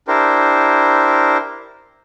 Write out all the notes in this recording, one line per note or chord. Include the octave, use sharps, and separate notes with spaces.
D4 E4 G4 A#4 C5